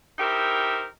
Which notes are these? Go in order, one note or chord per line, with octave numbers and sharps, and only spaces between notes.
D#4 E4 G4 A#4 C5 E5